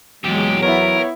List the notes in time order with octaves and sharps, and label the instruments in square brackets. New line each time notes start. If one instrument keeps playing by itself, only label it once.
[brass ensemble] E2 F#3 [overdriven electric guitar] A#2 G4 [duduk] G#3
[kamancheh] B3 E4 [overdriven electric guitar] A#4 [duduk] C#5